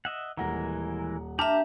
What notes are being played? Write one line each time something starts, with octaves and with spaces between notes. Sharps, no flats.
D#5 E5 F#5
D#1 E3 G#3 A#4 F#5 A#5
D4 G4 E5 A5 A#5 F6